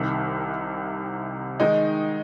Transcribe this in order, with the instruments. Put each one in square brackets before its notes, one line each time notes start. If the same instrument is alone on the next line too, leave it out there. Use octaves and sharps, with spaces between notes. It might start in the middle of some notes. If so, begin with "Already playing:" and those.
Already playing: [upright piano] C2 C3 D#3
D#3 G#3 D#4